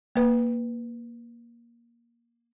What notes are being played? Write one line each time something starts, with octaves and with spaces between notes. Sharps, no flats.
A#3 B4